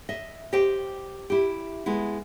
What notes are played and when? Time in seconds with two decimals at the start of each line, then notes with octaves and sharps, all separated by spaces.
0.09 D#5 E5
0.53 G4 C5 D#5 G5
1.30 E4 G4
1.86 G#3 B3 E4